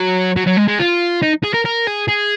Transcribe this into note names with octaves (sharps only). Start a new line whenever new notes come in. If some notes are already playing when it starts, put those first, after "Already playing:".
Already playing: F#3
F#3
F#3
G#3
G#3
F4
D#4
G#4
A#4
A#4
G#4
G#4